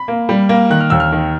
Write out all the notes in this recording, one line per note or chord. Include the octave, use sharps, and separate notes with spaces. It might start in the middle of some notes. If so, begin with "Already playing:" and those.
Already playing: B5
A#3
G3
A#3
D#3 F#6
F6
D#2 E6
F6
D#3